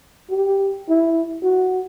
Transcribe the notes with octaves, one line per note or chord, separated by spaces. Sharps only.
G4
E4
F#4